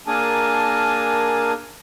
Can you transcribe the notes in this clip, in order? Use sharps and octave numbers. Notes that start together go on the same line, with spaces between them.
A#3 D4 G#4 A#4 G#5 A5